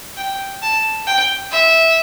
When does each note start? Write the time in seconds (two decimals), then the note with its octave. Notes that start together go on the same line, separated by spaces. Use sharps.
0.17 G5
0.62 A5
1.07 G5
1.51 E5